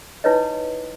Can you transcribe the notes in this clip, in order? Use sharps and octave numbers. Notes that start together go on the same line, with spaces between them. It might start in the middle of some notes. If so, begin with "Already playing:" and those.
D#4 E4 B4 C#5 D#5